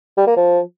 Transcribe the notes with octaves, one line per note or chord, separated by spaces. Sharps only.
G3
A#3
F3